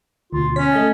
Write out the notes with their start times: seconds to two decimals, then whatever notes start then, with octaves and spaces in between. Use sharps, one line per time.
0.33 D2 B2 F4
0.56 C#4 C#5 B6
0.71 A3 D#5 A5